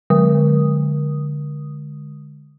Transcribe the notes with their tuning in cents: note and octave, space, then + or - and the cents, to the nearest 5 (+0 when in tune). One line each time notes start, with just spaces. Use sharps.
D3 +0 G#3 +0 D#6 +0